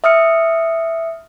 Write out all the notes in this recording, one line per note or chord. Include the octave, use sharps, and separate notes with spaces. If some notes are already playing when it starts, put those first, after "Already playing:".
E5 D#6 F6 C#7